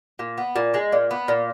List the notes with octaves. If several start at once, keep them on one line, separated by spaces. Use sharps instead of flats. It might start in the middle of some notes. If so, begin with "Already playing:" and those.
A#2
B3
A#2
G#3
A#2
B3
A#2